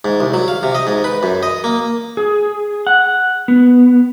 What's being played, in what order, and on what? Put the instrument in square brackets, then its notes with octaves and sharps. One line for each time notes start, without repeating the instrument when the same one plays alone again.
[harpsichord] G#2
C2
F#3
F5
C3
D#5
G#2
B4
F#2
D#5
A#3
[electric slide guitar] G#4
F#5
B3